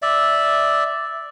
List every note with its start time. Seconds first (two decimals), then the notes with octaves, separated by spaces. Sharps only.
0.02 D5 E5